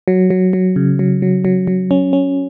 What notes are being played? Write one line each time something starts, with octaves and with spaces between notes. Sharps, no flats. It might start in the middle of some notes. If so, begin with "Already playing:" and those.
F#3
F#3
F#3
C#3
F#3
F#3
F#3
F#3
C#4
C#4